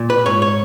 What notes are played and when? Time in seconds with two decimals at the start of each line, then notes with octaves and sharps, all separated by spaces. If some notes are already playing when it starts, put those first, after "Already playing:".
Already playing: A#2
0.10 B4
0.26 G#2 C#5
0.42 C#5